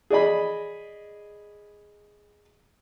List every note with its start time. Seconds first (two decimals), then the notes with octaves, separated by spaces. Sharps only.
0.10 G#4 D5 D#5 B5